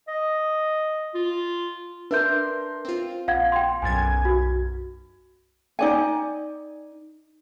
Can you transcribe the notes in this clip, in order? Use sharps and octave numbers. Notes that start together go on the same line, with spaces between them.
D#5
F4
D4 A#4 B4 E5 C6 G6
C4 F4
A#1 F5 F#5 G#6
G5 C6
B1 F#2 G#5 G#6 A6
F#4
D#4 D5 G#5